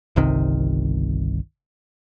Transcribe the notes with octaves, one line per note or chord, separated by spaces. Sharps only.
G1 C2 C3 D#3